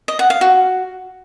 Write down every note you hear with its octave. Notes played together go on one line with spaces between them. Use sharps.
D#5
F#5
F5
F#4